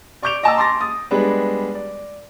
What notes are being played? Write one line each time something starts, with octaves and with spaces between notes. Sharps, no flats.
D5 C#6 D6 G6 D7 F7
D#5 G5 A5 A#5 D6 E6
C6 D6 A6 A#6
D#6 A6
G3 G#3 B3 D4 B4
D5